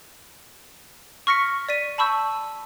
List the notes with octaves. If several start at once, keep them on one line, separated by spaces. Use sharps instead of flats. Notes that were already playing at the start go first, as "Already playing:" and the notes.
C#6 F6 A#6 B6 C#7
D5 B6 D#7
A5 B5 C#6 E6 G6